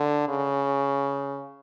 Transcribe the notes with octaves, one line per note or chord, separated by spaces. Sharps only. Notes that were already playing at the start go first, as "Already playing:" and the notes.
Already playing: D3
C#3